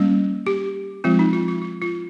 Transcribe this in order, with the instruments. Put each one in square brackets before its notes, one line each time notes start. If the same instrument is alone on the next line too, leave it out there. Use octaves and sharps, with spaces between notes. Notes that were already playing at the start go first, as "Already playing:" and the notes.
Already playing: [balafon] G3 A#3 C#4
G4
F3 G#3 C4 F4
D#4
F4
F4
F4
F4